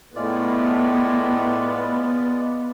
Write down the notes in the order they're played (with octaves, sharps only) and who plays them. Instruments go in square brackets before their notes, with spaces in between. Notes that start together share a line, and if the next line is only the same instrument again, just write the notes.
[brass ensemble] A2 [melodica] G#3 F4 D5 [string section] B3